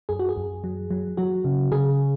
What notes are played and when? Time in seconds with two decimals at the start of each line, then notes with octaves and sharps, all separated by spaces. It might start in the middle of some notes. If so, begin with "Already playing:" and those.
0.09 F#2 G#4
0.19 F#4
0.29 G#4
0.37 F#2
0.64 F#3
0.91 F#3
1.17 F#3 F#4
1.45 C#3
1.72 C#3 G#4